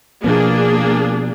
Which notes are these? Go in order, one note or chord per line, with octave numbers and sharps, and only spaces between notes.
B2 F3 A#3 B3 D4 G#4